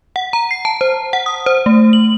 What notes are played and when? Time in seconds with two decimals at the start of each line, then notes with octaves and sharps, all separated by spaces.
0.16 F#5
0.33 A#5
0.51 C7
0.65 A5
0.81 C5
1.13 F#5
1.26 D#6
1.46 C5
1.66 A3
1.93 F#7